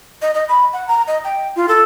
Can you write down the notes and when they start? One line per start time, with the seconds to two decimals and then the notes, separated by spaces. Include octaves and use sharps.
0.22 D#5
0.35 D#5
0.49 B5
0.73 F#5
0.88 A#5
1.07 D#5
1.24 G5
1.56 F4
1.69 A4